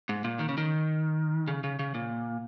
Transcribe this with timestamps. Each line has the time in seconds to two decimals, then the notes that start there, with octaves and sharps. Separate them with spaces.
0.09 G#2
0.24 A#2
0.39 D#3
0.49 C#3
0.58 D#3
1.47 C#3
1.64 C#3
1.79 C#3
1.94 A#2